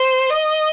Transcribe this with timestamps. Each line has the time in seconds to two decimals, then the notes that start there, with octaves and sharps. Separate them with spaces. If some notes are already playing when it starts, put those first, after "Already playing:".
Already playing: C5
0.30 D#5